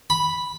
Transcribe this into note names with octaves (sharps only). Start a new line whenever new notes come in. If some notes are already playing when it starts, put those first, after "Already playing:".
B5